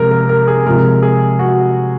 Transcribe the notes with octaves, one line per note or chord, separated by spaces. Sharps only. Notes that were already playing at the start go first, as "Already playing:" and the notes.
Already playing: C3 F3 G#3 A#4
A#4
A#4
G#4
C3 F3 G#3 A#4
G#4
F#4